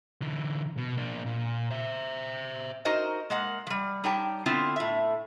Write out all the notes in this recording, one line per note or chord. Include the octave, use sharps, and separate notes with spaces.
D3 E3
B2
A#3 D4
A#2
C5 E5
D#4 F#4 A#4 C5 D#5
G#3 A#3 F#5
F3 G3
G3 D#4 G4 C#5 G5 A5
D3 B3 C4 E4 F4 C#5
A2 E5